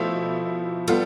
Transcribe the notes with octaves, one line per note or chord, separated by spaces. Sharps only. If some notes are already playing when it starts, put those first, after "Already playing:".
Already playing: B2 F3 A3 E4
G3 B3 F4 A4